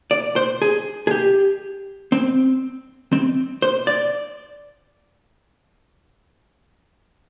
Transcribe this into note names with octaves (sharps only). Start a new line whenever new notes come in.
D5
C5
G#4
G#4
G4
C4
C4
C5
D5